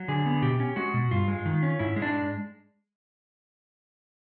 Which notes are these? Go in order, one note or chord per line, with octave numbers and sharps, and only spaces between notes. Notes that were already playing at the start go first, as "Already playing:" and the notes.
Already playing: F#3
D3 G#4
B3
B2 G4
C#4
G#3 F#4
B2
G2 F4
G#3
D#3
C#4
G#2 E4
G#3
D4